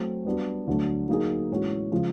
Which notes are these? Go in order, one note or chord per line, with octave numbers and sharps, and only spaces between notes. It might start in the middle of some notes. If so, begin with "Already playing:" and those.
Already playing: F#3 A3 C4
G3 B3 D4 F#4
D2 D3 F#3 A3
F#3 A#3 D#4 G#4
A2 E3 G#3 C#4 F#4
C#3 F3 G#3